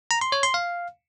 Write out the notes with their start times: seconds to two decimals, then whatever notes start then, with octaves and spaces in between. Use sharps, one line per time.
0.11 A#5
0.21 C6
0.32 C#5
0.43 C6
0.54 F5